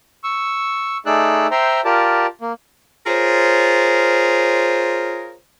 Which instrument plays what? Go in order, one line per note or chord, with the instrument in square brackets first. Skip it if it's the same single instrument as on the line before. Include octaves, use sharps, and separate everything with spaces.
[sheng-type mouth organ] C#6 E6
A3 D#4 G#4 D5 E6 F#6
C5 E5 G5 A#5 C6
F4 G4 A#4 D5 A5
A#3
[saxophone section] F4 G#4 A#4 C5 C#5